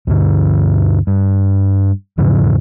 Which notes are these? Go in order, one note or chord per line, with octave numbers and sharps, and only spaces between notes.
D2 G2 D3
G2
E2 G#2 C#3 F3